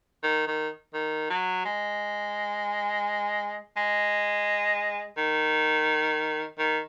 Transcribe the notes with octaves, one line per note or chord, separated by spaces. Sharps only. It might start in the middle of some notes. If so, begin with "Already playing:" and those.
D#3
D#3
D#3
F#3
G#3
G#3
D#3
D#3